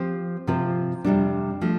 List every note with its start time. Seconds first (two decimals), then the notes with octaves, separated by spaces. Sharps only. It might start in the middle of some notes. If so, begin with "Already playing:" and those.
Already playing: F3 C4 G4 C5
0.47 C3 F3 C4 F4 C5
1.04 F2 C3 G3 D4
1.61 F3 A3